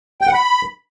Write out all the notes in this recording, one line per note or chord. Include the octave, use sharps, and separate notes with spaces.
G5
F#5
B5